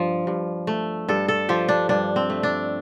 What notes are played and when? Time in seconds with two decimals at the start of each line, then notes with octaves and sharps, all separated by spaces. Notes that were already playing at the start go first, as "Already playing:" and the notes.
Already playing: G2 F3
0.27 G2
0.67 A3
1.08 G2 A4
1.28 A4
1.49 F3 G4
1.68 D4
1.89 G2 D4
2.16 C4
2.30 A3
2.43 D4